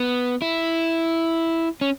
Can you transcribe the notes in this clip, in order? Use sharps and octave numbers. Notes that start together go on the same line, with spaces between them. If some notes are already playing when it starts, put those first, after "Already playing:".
Already playing: B3
E4
C#4